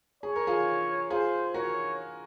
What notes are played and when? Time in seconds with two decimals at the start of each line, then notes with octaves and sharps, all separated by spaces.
0.23 G#4 C#5
0.36 A#4
0.47 F4 G#4
1.10 F4 G#4 C5
1.54 F#4 A#4 C#5